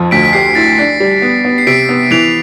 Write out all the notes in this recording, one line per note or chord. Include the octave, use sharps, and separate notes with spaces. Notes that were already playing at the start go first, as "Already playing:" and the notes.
Already playing: F2 F3
D2 B6 D7
B6
G4 C7
E4 A6
D4 C7
G3
B3
B3
C7
C3 B6 D7
B3
E3 D7 F7